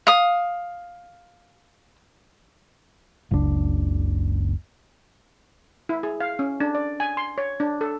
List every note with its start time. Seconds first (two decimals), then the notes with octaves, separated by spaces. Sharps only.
0.07 F5 D#6
3.31 F#1 C#2 C3 D4
5.89 E4
6.03 G#4
6.20 F5
6.39 C#4
6.60 D4
6.75 D5
7.00 G#5
7.17 C6
7.38 C#5
7.60 D4
7.81 A4